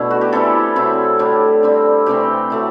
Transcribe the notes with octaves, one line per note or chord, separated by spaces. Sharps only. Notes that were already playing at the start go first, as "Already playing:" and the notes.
Already playing: B2 A3 B3 D4 E4
F#4
G4
E3 G3 C4 E4 A4
C3 F#3 C4 E4
A2 G3 D4
D3 G3 C4
C3 E3 A3 C4 G4
F#3 A3 E4